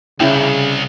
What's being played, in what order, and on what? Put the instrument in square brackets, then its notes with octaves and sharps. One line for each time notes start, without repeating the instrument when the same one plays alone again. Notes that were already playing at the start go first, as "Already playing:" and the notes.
[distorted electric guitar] C2 [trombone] C#3 [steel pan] C#4 E4 G5